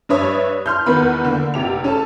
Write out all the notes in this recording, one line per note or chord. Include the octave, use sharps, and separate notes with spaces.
G2 D4 B4 C#5 E5 D#6
C6 F6 G6
E2 D#3 B3 B5
D3 A#3
F1 C3 G4 F7
C#4 A4 A5